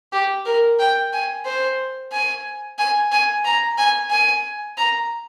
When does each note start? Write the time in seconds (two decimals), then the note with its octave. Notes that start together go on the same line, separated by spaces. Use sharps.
0.13 G4
0.46 A#4
0.79 G5
1.13 G#5
1.45 C5
2.12 G#5
2.78 G#5
3.12 G#5
3.44 A#5
3.78 G#5
4.10 G#5
4.77 A#5